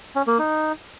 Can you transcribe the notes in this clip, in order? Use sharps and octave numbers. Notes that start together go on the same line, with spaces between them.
C#4
A#3
D#4